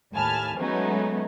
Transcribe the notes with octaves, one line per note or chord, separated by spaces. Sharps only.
D#2 A2 G#5 A5 B5 F6
F#3 G#3 A3 B3 C#4 D#4